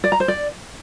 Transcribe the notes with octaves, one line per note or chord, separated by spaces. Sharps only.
D5
A#5
C5
D5